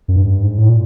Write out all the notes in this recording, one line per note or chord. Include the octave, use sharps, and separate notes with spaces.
F#2
G2
G#2
A2
A#2